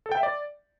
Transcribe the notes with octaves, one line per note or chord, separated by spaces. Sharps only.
A4
G5
E5
D5